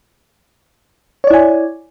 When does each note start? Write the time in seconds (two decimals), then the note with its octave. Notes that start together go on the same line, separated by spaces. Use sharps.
1.24 C#5
1.27 D5
1.30 E4
1.34 G#5